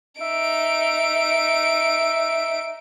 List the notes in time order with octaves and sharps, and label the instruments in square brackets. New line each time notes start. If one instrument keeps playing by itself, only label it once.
[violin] D#4 D7 [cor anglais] E5